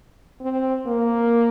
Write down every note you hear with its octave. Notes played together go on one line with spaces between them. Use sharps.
C4
A#3